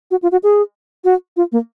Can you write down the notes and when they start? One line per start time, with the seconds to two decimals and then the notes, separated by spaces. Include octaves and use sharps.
0.11 F#4
0.22 F4
0.32 F#4
0.43 G#4
1.04 F#4
1.37 F4
1.52 A#3